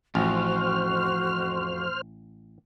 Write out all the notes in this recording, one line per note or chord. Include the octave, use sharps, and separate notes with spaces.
A1 F2 F#4 C5 F6